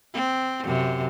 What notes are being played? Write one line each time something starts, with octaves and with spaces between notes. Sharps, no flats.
C4
F#2 C3